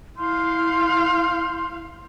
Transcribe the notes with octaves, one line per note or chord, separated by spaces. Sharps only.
E4 F5 C6 G6